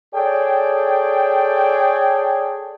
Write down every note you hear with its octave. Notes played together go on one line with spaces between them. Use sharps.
G#4 A4 C#5 D5 G5